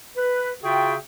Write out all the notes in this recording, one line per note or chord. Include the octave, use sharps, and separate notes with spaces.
B4
C#3 F4 F#4 G#4 E5 G5